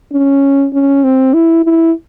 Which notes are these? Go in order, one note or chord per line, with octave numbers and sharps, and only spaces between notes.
C#4
C#4
C4
E4
E4